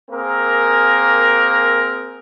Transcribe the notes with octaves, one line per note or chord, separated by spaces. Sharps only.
A#3 C4 G#4 A#4